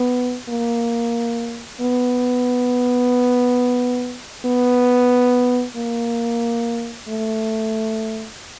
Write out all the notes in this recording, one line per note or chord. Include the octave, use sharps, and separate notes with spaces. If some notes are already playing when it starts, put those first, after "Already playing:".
Already playing: B3
A#3
B3
B3
A#3
A3